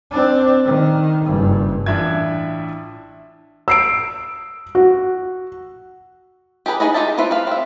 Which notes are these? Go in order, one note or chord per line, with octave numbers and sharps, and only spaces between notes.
C4 D4
D#3
F#1 G2
A1 D4 E4 F4 E5 G#6
E6 C7 D7
F#4
G4 G#4 A#4 B4
D#4 F#4 G#4 B4 D#5
D#4 F4 G4 E5 A5
C4 E4 F4 B4 E5
B4 F5
C4 E5